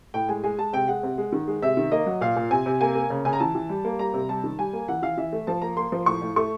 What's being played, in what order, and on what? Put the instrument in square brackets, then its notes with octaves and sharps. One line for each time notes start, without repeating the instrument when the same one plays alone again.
[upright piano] A2 G5
G#3 G#5
G#3 G#5
G#3 A5
C3 G5
G#3 F#5
C3
G#3
D#3
G#3
C3 E5
D#3
A#3 D#5
F#3
A#2 F5
A#2
C3 G#5
C3
A#3 G#5
A#3
C#3
C#3 G#5
A#5
E3 A5
E3
G3
A#3
G3 A#5
C3
G3 A5
D#3
G3 G#5
A#3
E3 F#5
E3 F5
E3 E5
A3
F3 A5
A#3 A#5
A#3 C6
F3
A2 C#6
A2
A3 C#6